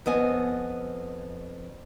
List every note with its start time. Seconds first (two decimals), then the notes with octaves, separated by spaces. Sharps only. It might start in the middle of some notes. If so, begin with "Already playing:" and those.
0.06 F2 B3 D#5 G#5